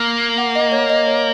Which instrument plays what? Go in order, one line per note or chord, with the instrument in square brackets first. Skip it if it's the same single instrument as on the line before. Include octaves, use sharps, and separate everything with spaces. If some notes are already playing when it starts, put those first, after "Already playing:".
Already playing: [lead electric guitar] A#3
[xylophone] F#5
D#5
C#5
D#5
C#5